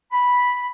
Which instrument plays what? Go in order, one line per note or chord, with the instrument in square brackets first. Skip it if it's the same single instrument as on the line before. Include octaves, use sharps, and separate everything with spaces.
[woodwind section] B5